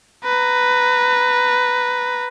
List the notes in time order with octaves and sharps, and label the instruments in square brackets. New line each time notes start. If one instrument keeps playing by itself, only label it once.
[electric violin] B4 A#5